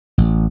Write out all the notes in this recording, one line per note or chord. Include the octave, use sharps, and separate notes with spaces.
A1